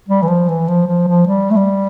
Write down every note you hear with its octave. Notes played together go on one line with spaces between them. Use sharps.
G3
E3
F3
E3
F3
F3
F3
G3
A3
G3